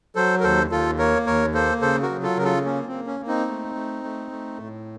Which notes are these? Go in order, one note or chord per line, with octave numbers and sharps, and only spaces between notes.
F#3 A4 C5
A#4
D#2 A4 C5
D#2 F4 A4
A#3 A#4 C#5
D#2 A#4 C#5
A#3 A4 C5
C#3 A4 C5
F#4 A#4
F#3
F4 A4
C#3 A#4
F4 A4
A#3 C#4
C4
A#3
C#4
A#3
C4 D#4
A3
A3
A3
A3
A2